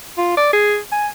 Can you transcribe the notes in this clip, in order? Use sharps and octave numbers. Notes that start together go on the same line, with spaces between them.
F4
D5
G#4
G#5